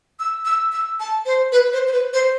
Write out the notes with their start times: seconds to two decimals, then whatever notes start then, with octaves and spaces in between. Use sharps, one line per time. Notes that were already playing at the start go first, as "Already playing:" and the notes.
0.20 E6
0.45 E6
0.72 E6
1.00 A5
1.26 C5
1.52 B4
1.73 C5
1.87 C5
1.92 B4
2.13 C5